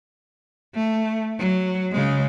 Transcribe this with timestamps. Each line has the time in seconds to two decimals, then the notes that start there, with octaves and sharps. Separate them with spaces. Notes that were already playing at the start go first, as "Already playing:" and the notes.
0.75 A3
1.39 F#3
1.92 C#3 G#3